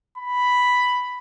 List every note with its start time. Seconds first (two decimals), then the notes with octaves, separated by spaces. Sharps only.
0.18 B5